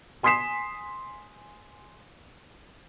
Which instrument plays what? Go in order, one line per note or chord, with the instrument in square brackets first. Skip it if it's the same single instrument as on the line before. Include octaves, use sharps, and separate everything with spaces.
[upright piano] G#5 C6 D#6 B6 C7 E7